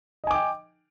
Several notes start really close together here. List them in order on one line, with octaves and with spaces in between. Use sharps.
D#5 G#5 D6 G5